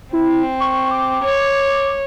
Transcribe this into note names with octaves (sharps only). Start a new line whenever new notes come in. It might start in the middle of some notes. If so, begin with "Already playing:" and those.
C4 E4
C#6
D6
C#5